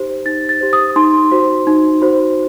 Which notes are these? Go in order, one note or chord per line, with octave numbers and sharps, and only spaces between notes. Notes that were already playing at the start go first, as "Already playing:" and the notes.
Already playing: D#4 G4 C5
D#4 A6
A6
G4 C5
D#6
D#4 C6
F#4 C5
D#4
F#4 C5